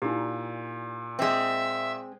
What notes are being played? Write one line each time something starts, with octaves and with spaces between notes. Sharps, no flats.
A#2 D#4 E4 G4
G#3 C4 E5